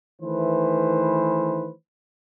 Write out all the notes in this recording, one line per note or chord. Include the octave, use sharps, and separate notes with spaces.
D#3 E3 A3 B4 C5